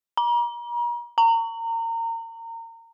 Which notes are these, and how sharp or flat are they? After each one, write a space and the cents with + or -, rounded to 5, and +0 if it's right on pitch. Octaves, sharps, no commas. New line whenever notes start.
A#5 +40
A#5 -30